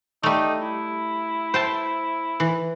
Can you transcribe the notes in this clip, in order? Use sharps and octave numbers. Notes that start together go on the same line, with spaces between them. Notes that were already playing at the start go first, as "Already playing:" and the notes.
G3 A3 D#4
E4
C5 G5 A5
E3